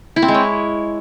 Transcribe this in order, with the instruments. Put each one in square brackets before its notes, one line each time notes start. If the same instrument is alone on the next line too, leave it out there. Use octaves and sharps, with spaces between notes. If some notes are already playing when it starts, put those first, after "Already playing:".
[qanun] E4
C4
G#3
C#5